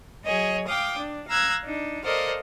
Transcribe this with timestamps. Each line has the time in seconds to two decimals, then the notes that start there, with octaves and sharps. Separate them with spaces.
0.24 F#3 G#4 C#5 D#5
0.68 F5 G5 D6 D#6
0.97 D4
1.29 F5 A#5 E6 F#6 G#6 A#6
1.65 D4 D#4
2.05 A4 A#4 C5 D5 D#5 F5